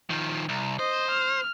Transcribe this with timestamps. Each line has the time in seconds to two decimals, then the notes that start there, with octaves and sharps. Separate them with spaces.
0.10 D#3 F3
0.49 C2
0.79 C5 D#5
1.11 F6